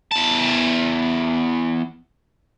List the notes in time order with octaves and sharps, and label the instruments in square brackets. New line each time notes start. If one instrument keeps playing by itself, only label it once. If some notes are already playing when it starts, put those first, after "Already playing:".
[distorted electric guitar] E2 A5